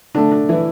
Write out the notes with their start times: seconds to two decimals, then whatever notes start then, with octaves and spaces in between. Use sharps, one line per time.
0.15 D3 A3 D4
0.32 D4
0.49 E3 E4